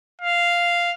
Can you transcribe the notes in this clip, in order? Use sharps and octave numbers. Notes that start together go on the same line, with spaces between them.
F5